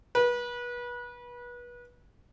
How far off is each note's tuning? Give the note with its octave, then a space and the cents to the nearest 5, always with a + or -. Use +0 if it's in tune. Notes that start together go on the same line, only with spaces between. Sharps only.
B4 -30